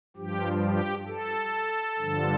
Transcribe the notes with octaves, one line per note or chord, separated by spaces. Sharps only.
G2 F3 G4
G4
A4
G2 D3 F3